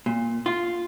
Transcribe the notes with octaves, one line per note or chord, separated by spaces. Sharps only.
A#2
F4